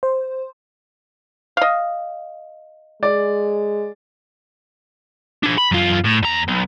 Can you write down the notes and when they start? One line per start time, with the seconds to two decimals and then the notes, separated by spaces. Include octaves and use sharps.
0.03 C5
1.57 D#5 F5
3.03 G#3 D5
5.43 D4 G#4
5.58 B5
5.72 F#2 F4
6.05 A2
6.23 E2 A#5
6.48 B1